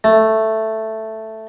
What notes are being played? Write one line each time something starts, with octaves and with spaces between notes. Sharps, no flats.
A3